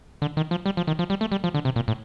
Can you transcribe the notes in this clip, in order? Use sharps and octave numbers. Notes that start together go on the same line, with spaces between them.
D3
D#3
F3
G3
F3
D#3
F3
G3
A3
G3
F3
D3
C3
A#2
A2